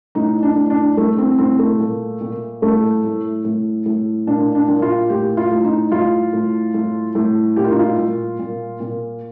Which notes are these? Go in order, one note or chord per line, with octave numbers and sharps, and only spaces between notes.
A2 D#4
D4
A2
D4
A2 A3
C4
A2 C4
A3
A#2
A#2
A2 A3
A2
A2
A2
A#2 D4
D4
A#2
F4
A2 G4
F4
A2
D#4
A2 F4
A2
A2
A2
A#2 G4
F4
D#4
F4
A#2
A#2
A#2